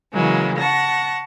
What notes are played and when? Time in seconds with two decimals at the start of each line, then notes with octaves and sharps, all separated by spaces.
0.13 C#3 E3 F#3 G#3 A#3
0.57 F#5 A5 C#6 A#6